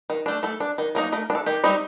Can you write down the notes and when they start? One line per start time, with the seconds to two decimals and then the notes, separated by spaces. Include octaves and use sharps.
0.10 D#3
0.26 A3 D4
0.43 A3 A4
0.60 D4
0.78 D#3
0.95 F#3 A#3 D#4
1.12 A3 A#4
1.30 D4
1.35 A4
1.46 D#3 G4
1.64 G3 C4 D#4